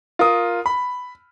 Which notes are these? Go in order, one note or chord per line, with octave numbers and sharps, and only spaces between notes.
F4 A#4 D#6
B5